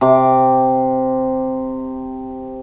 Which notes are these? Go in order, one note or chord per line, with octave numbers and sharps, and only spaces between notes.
C3 D6